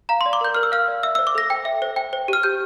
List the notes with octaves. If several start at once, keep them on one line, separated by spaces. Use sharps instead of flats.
F5 A#5
C6
D5
D6
A#4 G6
A#4 F6
E6
F5 F6
D5
E5 E6
E6
C5
D6
A4 A#6
G5
E5
C5
G5
C5
G4 F6
G4 G6